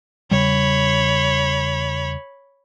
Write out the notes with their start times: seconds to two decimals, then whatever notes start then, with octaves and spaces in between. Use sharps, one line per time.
0.31 E2 C#3 G3 C#5 B5